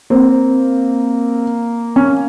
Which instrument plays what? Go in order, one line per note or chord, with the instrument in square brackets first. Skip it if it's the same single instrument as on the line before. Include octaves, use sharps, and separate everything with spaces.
[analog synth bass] A#3 [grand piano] C4
[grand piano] C#4